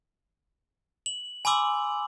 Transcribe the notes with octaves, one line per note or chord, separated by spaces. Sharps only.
F#7
G#5 B5 C6 D6 E6 F#7